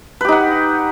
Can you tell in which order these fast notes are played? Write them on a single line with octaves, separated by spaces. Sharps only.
B4 G4 D#4 F#5